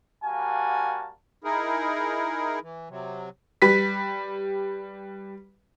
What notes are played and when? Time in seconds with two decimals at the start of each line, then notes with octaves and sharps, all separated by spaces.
0.25 G3 A#3 F#4 F5 G#5 A5
1.44 D#4 E4 G#4 A#4
2.62 E3
2.90 C3 F#3
3.62 G3 B4 B6